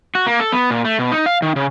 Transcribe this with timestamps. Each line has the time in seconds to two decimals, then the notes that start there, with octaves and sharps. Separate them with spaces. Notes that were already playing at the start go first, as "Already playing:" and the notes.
0.15 F#4
0.26 A#3
0.40 A4
0.52 B3
0.71 A#2
0.85 A3
0.99 B2
1.12 D#4
1.26 F5
1.42 D#3
1.56 C#3